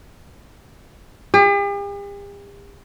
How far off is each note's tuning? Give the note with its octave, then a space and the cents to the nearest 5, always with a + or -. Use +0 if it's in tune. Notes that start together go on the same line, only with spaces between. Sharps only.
G4 +45